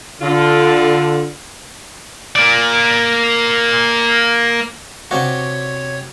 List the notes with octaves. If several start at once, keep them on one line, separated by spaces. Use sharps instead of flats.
D3 F4
A#3 D5
C3 C4 D4 F#4 C#5